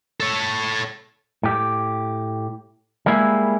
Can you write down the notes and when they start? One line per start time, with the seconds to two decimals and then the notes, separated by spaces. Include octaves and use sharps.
0.20 A4 C#5
1.43 A2 G4
3.06 G3 G#3 A#3 E4 G#4